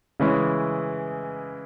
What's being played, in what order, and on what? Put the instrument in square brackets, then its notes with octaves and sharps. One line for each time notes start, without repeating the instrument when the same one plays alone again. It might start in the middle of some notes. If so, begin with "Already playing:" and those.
[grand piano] C#3 E3 G#3 C#4 E4